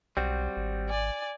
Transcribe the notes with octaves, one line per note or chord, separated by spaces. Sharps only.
B1 G3 C4 F#4
G#1
D5 G#5